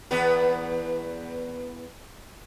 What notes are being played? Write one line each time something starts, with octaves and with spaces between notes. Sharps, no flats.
E2 B3 B4